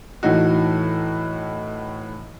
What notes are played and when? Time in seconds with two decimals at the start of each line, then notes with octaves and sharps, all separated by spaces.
0.23 A2 E3 D#4 F#4